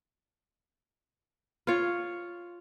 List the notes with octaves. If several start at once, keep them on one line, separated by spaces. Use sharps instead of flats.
F4 C#5